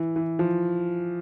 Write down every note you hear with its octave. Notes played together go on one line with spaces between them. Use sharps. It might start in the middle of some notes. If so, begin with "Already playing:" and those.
Already playing: E3
E3
F3